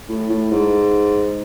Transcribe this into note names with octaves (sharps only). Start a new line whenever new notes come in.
A2
A2
G#2